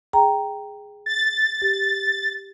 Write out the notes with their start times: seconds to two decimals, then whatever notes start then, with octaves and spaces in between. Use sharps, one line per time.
0.13 G#4 G5 A#5
1.06 A6
1.62 G4